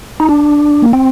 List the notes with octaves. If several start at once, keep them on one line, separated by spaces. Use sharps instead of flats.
D#4
D4
A#3
C4